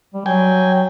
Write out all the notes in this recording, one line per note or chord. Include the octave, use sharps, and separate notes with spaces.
G3
F#3 G5 G#5